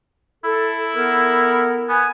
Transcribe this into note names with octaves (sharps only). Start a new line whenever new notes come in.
E4 A4
B3 A4 A#4
B3 G#5